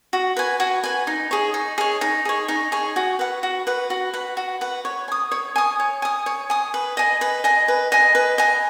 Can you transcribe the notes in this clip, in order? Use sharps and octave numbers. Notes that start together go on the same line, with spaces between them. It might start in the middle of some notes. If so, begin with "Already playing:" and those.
F#4
B4 G#5
F#4
B4 G#5
D#4
G#4 C#5
D#4
G#4 C#5
D#4
G#4 C#5
D#4
G#4 C#5
F#4
B4 F#5
F#4
B4 F#5
F#4
B4 F#5
F#4
B4 F#5
C#5
G#5
D#6
C#5
G#5 D#6
C#5
G#5 D#6
C#5
G#5 D#6
B4
D#5 G#5
B4
D#5 G#5
B4
D#5 G#5
B4
D#5 G#5